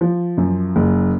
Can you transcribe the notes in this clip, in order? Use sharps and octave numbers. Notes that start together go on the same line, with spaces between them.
F3
F#2
F#1